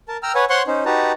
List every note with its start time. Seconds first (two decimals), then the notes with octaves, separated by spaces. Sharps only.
0.08 A#4 A5
0.23 G5 A#5 E6 F6
0.35 B4 C#5 F#5 G#5
0.50 C5 C#5 F#5 C6 C#6 F#6
0.67 C#4 D#4 C5
0.85 D#4 F#4 G4 B4 A5 A#5